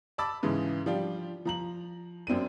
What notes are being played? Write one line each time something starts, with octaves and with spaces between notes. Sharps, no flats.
A5 B5 D6 E6 A6
G#2 C#3 E3
F3 G3 D4 F4 G4
F3 A#5 F#7
F#2 C4 D4 D#7